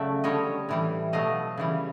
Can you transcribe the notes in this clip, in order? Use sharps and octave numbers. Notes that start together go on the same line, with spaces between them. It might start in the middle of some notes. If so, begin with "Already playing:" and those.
Already playing: C#3 F#3 A3 D5 E5
D3 G3 C#5 D#5
A2 E3 G3
B2 F#3 A3 D#5 F5
C#3 E3 G3